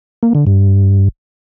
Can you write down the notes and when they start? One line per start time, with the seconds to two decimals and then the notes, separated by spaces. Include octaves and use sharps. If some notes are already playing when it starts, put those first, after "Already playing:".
0.23 A#3
0.35 D3
0.47 G2